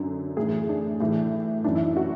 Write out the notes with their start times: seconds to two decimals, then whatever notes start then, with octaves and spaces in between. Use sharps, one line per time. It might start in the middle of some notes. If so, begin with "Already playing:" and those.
Already playing: F#2 D3 F#3
0.37 A2 E3 G#4
0.69 D4
1.00 A2 E3
1.64 F#2 E3 D4
1.75 E4
1.86 E4
1.97 F#4